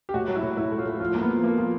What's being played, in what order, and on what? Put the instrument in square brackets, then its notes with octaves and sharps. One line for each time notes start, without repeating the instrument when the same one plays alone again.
[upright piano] G4
[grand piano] A2 [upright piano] F#4
[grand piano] F#3
[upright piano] E4
[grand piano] A2
[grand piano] A2 [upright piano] E4
[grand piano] A3
[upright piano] F4
[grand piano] A3
[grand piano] F3 [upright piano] F4
[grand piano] A#3
[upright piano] B3
[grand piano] F3
[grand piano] F3 [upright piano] A#3
[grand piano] F3